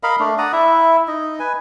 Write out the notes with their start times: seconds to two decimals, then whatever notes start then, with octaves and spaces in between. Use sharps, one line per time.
0.03 A#4 D#5 F5 B5
0.19 A3 D4
0.38 D5 F#5 A#5 D#6
0.53 E4 E5
1.08 D#4 D#5
1.39 B4 G#5